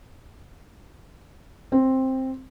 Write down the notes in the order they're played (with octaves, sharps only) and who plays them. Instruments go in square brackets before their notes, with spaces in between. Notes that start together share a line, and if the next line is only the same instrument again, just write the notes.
[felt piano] C4